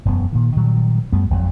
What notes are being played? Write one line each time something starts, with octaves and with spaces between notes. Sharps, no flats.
E1 F#2 G3 B3
A#2 D#3
A#2 D#3 F#3 G3
F#2 G3 A3 B3
G#1 F2 C#3 F#3